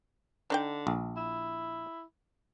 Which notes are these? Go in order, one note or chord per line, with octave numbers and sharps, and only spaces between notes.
D3 D4 D#4 G5
A#1
E4